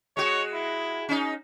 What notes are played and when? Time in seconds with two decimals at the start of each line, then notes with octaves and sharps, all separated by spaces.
0.17 G#3 F#4 C#5
0.54 E4
1.09 C#4 D#4